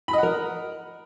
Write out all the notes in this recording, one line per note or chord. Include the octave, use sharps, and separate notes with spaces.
A#4 D#5 F#5 B5